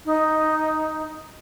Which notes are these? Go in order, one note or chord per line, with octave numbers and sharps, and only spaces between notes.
D#4